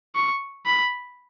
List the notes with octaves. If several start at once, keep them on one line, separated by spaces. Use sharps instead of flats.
C#6
B5